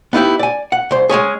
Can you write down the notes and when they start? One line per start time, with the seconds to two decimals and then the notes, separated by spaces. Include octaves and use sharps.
0.13 B3 D#4 E4 G4
0.39 D5 G#5
0.72 F#5
0.91 C2 C5
1.09 G#3 A3 C#4 G#4